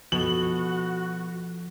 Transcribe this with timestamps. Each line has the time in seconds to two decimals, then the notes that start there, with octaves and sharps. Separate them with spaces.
0.12 B2 F3 F#4 A4 F#7